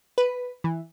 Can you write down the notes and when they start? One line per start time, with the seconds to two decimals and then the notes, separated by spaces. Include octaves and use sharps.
0.18 B4
0.64 E3